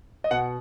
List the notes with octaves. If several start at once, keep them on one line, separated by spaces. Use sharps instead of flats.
D#5
B2 F#5